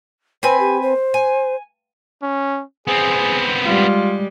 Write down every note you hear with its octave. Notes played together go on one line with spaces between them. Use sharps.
C4 B4 C5 G#5
G4
C5
G#5
C#4
B3 C4 G#4
G3 G#3 F4